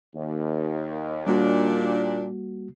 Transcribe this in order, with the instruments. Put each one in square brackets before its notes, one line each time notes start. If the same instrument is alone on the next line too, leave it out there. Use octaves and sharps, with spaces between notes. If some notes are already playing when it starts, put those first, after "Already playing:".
[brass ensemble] D#2
[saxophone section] A#2 D4 [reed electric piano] G3 A#3 F#4